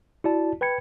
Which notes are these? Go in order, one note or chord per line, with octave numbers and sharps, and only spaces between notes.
E4 F#4 D5 A5
B4 G5 B5 G#6 C#7